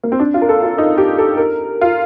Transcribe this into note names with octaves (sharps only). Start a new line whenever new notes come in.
A#3
C4
D4
F4
A#4
A4
F4
D#4
G4
A4
A#4
F4